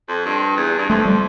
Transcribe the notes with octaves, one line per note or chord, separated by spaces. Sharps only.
F2
G2
E2
G2
F2 A3
G3